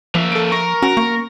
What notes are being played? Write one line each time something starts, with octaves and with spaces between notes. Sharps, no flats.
F3 A#3 E5
A4 D7
A#4 C#6
C#4 F#4
A#3 C#6